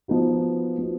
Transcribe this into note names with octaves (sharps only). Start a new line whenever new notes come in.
F3 B3 D#4 F#4
F3 B3 D#4 F#4